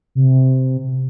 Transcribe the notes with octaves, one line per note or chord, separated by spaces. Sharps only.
C3